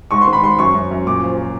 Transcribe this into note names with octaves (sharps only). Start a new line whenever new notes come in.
G#2 C#6
C6
D#3
B5
G#2 C6
F#2 C#6
F#2
F#2
A#2 D6
F3
F3